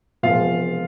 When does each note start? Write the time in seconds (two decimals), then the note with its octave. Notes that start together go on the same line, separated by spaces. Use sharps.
0.23 E1 E2 C3 F3 G#3 F4 F5